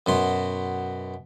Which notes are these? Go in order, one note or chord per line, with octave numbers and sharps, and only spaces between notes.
F#2 B2 C6